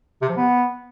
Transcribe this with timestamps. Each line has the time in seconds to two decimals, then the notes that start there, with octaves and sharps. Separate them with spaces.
0.22 C3
0.29 F3
0.37 B3